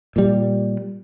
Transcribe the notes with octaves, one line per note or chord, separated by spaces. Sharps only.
A#2 G3